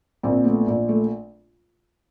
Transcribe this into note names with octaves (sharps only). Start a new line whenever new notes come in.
A#1 A#3 C4
A3 B3
A#1
A3